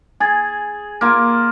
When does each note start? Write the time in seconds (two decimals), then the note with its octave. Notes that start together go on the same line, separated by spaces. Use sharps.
0.20 G#4 G#5 G#6 A6
1.01 A#3 F4